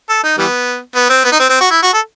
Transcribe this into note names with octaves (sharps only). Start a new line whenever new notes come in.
A4
D#4
E3 G3 B3
B3
C4
B3
D#4
C4
C4
F#4
E4
F#4
A4